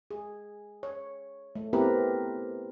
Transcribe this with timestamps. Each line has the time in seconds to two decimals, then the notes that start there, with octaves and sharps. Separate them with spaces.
0.11 G#4
0.83 C#5
1.55 A3
1.73 B3 C4 E4 G4 A#4 B4